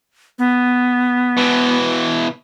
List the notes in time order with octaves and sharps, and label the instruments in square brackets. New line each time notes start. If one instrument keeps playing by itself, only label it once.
[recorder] B3
[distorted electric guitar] B2 E3